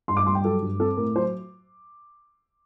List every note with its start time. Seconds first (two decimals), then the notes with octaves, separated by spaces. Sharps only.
0.08 G2 C6
0.17 D6
0.26 G3 C6
0.35 G5
0.44 F#3 A4
0.62 G2
0.80 C4 A4
0.97 A2 A#4
1.16 F#3 C5